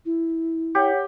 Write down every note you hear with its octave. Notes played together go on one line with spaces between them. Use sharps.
E4
G4 C#5 F#5